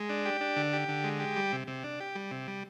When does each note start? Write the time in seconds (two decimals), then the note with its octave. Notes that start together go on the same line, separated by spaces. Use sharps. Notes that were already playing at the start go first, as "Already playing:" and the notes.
Already playing: G#3
0.10 D4
0.25 G4
0.41 D4
0.56 D3
0.73 G4
0.88 D3
1.04 G#3
1.20 G4
1.36 G3
1.52 C3
1.67 C3
1.84 D4
2.00 G4
2.15 G3
2.31 C3
2.47 G3